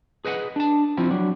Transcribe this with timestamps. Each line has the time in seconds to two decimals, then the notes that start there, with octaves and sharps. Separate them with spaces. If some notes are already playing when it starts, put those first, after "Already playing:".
0.25 G#4 B4 D#5 E5 F#5
0.56 D4 A5
0.97 F3 C4 E4 F4
1.11 F#3 D4